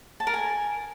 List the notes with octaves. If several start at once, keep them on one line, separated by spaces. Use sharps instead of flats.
A5
A#4
G#5